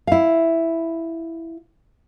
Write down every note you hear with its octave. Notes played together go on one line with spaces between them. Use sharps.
E4 F5